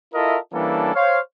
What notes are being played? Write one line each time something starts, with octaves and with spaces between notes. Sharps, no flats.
E4 F4 A4 A#4 D#5 E5
E3 G3 A#3 C#4 D4 A4
C5 C#5 F5